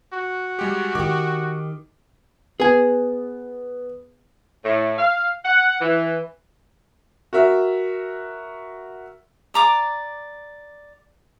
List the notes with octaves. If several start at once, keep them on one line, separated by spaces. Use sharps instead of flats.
F#4
G3 G#3 G4
D#3 G4 D6
B3 G#4 G#5
A2
F5
F#5
E3
F#4 A#4 E5
D5 A#5 D6